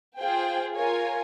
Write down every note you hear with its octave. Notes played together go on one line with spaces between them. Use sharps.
F4 G#4 C5 G5
F4 A#4 C#5 G#5